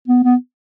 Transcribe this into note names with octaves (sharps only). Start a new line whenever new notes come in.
B3
B3